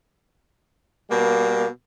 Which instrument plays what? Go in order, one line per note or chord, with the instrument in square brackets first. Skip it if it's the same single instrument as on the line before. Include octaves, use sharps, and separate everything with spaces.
[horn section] B2 G3 A#3